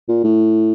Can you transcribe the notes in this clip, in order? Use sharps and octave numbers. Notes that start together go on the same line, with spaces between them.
A#2
A2